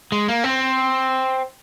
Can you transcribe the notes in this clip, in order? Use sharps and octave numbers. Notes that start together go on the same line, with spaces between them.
G#3
A#3
C4